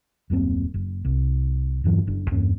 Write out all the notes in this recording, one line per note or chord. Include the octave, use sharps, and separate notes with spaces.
D#1 F#2 A#3 C4
F#1
C2
E2 G2 E3 F#3
F#1 D4
E2 G2 A#3 C#4